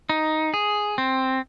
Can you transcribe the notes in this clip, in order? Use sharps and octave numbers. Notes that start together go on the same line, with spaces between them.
D#4
G#4
C4